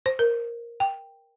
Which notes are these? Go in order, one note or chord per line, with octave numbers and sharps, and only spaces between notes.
C5
A#4
G5